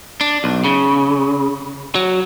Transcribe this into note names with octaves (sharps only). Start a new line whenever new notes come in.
D4
B1
C#3
F#3